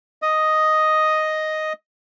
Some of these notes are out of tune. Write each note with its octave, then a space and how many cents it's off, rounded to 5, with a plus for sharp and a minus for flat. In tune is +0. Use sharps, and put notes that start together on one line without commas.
D#5 +0 D#6 +0